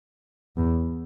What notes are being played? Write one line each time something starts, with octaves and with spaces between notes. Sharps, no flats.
E2